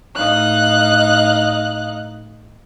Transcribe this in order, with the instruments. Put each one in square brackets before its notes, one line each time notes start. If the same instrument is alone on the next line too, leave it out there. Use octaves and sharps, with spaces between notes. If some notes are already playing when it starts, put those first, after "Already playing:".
[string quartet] A2 D#4 D#5 F5 F#6